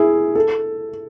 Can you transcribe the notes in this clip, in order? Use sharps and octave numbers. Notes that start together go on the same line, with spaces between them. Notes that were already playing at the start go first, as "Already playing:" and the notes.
Already playing: E4 G#4
A4